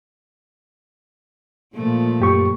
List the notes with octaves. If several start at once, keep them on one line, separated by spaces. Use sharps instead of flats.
A#2 F3 A3
F#2 G4 C#6